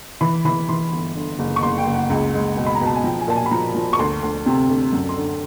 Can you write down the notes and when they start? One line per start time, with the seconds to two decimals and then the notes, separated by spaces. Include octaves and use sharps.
0.21 E3 B5
0.45 E3 B5
0.69 E3 C6
0.92 G1
1.16 D3
1.39 F#1
1.56 C#6
1.63 F#1 C6
1.78 G5
1.87 F#1
1.94 F#5
2.10 C#2
2.34 G#3
2.57 B2
2.66 B5
2.75 A#5
2.81 B2 A5
2.95 G#5
3.04 F3 G5
3.21 G#5
3.28 A#2 A5
3.36 G#5
3.46 B5
3.51 F3 A#5
3.75 F3
3.93 C#6
3.99 D2 C6
4.23 D2
4.46 C3
4.70 D2
4.93 F#2
5.09 C6
5.17 D3